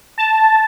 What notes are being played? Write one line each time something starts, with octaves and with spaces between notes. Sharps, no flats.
A5